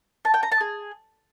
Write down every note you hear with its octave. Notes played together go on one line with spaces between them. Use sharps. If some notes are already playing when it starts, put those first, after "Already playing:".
A5
G5
A#5
A5
G#4